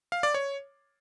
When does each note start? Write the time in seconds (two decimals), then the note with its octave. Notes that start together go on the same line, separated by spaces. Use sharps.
0.12 F5
0.23 D5
0.34 C#5